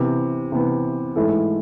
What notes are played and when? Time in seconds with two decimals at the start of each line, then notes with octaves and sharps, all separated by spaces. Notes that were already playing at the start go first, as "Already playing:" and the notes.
Already playing: C3 E3 B3
0.52 C3 E3 B3
1.16 G#2 E3 A3 E4 A4